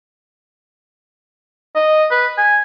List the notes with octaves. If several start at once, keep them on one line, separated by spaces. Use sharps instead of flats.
D#5
B4
G#5